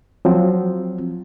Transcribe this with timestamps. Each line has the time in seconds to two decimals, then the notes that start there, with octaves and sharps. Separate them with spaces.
0.25 F3 F#3 C4